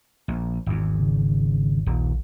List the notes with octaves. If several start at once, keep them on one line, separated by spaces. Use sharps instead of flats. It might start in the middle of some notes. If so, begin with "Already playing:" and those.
A#1
G#1 E2
C#3
D#1 A#1